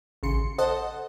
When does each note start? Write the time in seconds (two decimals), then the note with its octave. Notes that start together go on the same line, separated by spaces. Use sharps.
0.23 A1 C#3 C6 C#7
0.58 A4 C5 D#5 F#5 A5